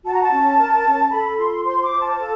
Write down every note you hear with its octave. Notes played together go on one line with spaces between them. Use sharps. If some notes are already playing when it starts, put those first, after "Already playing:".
F#4 A5
A#5
A5
C#4
A#4
C#4
A4 B5
F4 C6
C5 C6
D6
F4
A5
A4